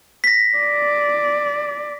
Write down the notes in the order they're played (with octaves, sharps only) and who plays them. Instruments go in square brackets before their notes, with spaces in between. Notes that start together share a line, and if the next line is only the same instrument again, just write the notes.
[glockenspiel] A#6 B6
[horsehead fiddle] D5